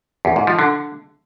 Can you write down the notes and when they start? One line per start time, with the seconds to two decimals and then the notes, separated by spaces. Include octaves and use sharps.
0.25 E2
0.36 G#2
0.47 F3
0.59 D3